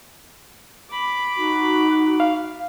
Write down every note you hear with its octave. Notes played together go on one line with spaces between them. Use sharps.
B5 D6
D#4 F#4
F5